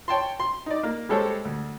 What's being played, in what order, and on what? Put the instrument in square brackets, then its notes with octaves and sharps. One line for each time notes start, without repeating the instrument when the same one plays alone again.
[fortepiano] C#5 G5 A5 C6
C6
D#4 D5
A#3
G3 G#3 A4 C5 C#5
D2